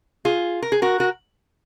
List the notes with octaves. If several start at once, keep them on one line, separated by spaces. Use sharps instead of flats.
F4 G#4
A#4
G#4
F#4 A#4
F#4 A#4